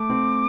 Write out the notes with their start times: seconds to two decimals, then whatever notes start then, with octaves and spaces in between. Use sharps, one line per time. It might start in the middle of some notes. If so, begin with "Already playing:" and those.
Already playing: A3 D6
0.10 C4